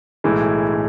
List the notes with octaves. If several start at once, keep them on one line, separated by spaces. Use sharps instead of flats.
B1 A2 E3 G#3
A2